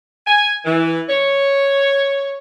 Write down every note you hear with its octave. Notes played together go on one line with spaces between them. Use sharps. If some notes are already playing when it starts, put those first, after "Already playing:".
G#5
E3
C#5